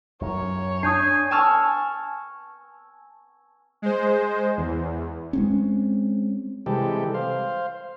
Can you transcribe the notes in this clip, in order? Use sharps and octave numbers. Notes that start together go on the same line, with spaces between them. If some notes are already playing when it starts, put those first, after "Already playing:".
F#2 C#5
D4 G#5 D#6 G6 C7
G#5 A5 C#6 E6 F6 A6
G#3 C5
E2
G#3 C4 C#4
C3 E3 G3 G#3 G4 A4
C5 F5